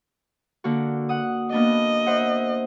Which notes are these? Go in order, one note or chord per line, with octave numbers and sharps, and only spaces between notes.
D3 A#3 F#4
F#5 D#6
A#3 B3 D4 D#5
C5 E5 F#5